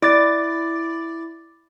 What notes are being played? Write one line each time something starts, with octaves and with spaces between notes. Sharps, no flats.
E4 D5 D6 A6